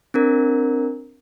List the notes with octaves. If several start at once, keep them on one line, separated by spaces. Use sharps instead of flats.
C4 D4 A#4